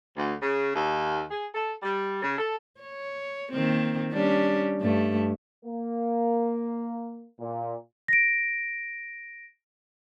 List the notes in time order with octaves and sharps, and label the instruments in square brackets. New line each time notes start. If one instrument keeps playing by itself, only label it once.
[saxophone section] D2
C#3
D#2
G#4
A4
G3
C#3
A4
[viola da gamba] C#5
D#3 A#3 C4
G3 C#4 D4
G2 A3
[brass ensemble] A#3
A#2
[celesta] A#6 D7